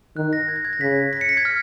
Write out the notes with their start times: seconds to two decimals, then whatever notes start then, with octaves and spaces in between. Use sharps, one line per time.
0.17 D#3 F#6
0.33 A#6
0.48 G#6
0.56 A#6
0.65 G#6
0.73 A#6
0.81 C#3 B6
1.13 B6
1.21 C#7
1.29 B6
1.37 G#6
1.45 F6